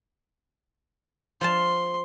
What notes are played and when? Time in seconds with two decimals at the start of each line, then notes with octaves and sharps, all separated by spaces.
1.41 F3 F5 A5 C6